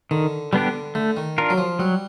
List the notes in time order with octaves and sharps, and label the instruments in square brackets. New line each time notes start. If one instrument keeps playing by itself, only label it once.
[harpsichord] D3 [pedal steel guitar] D#3
[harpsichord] D3 [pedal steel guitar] G3 B3 D4 G4
[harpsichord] D3 [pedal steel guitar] A3
[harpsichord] D#3
[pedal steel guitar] D4 F4 A#4
[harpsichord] F#3
F3
[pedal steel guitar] F#3 [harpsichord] G3